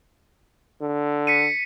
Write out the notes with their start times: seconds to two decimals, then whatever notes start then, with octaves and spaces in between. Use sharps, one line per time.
0.81 D3
1.27 B6 C#7 D#7